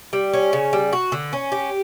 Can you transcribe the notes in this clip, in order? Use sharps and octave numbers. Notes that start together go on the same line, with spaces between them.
G3
C#4
C#3
G3
F#4
D3
C#4
G4